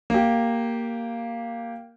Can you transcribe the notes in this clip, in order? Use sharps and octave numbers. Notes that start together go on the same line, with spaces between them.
A#3 G4